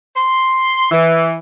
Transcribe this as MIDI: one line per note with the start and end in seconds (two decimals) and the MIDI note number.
0.16 0.87 84
0.91 1.34 52